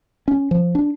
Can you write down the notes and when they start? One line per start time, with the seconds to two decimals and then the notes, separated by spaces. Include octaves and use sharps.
0.28 C#4
0.51 F3
0.75 D4